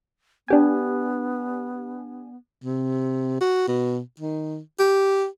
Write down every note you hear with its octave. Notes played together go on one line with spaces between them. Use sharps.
B3 D4 G4 G#5
C3
F#4
B2
D#3
G4